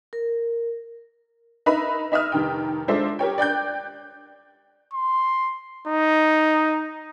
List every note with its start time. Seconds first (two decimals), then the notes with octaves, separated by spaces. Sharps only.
0.13 A#4
1.66 D#4 A#4 B4 E5 A#5 B5
2.12 D#4 E5 D#6 F6
2.32 F1 D#3 G5
2.88 G#3 D4 F4 A4 C5 E5
3.19 G4 A#4 C#5 G5
3.38 D5 G5 F#6 G6
4.93 C6
5.87 D#4